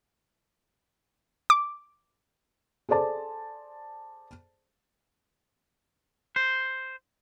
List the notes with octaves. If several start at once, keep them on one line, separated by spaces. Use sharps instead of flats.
D6
G#4 A4 C5 D5 A5
C5